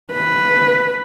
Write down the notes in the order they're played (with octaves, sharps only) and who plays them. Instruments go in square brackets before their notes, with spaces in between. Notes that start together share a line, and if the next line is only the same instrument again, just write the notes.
[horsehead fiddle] B4